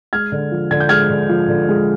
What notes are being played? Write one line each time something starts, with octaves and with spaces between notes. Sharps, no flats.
G#3 F6 G#6
D3
F3
D3 G#6
G6
G#3 F6 G#6
D3
F3
D3
G#3